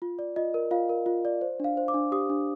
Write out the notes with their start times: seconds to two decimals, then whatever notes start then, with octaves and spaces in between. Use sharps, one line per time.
0.02 F4
0.19 D5
0.36 F4 D#5
0.54 A#4
0.71 F4 F5
0.89 A#4
1.06 F4
1.25 D5
1.41 C5
1.60 D4 F5
1.77 C5
1.88 D6
1.94 D4
2.12 G4 D#6
2.30 D4